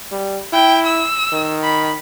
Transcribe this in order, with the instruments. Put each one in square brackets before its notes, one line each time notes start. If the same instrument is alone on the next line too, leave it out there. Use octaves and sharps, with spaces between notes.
[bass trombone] G3
[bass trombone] E4 [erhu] G5
[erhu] E6
[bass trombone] D#3
[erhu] B5